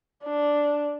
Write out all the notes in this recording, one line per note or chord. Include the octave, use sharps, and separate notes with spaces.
D4